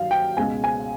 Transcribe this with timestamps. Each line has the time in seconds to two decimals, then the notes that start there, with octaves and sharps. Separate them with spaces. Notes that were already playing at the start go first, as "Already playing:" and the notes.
Already playing: G2 D#3 F#3 F5
0.11 G5
0.37 C#2 B2 G#3 G#5
0.64 G#5